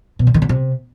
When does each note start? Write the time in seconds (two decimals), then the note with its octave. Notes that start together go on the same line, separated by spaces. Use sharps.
0.19 B2
0.27 D3
0.34 D#3
0.42 D3
0.49 C3